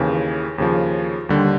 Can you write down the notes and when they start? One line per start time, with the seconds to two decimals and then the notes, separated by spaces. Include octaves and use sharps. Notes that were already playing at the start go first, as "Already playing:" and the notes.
Already playing: D#2 C#3 E3
0.58 D#2 C#3 F3
1.29 D#2 D3 G3